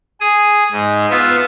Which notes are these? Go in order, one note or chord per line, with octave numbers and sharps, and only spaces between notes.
G#4 D#6
G#2
B3 F4 E5